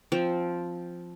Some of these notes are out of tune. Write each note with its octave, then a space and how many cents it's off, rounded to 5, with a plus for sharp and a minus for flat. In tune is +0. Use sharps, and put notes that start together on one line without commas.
F3 +0 C4 +0